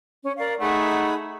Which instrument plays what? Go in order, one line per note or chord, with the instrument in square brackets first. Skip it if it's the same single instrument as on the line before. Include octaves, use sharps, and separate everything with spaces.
[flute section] C#4
A#4 D5 F5
[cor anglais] A3 [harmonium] D#4 F#5 [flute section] G#4 E5 B5